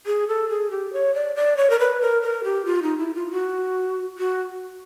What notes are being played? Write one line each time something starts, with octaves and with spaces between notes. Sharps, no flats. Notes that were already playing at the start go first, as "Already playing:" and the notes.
G#4
A4
G#4
G4
C#5
D5
D5
C#5
A#4
B4
A#4
A#4
G4
F4
D#4
E4
F4
F#4
F#4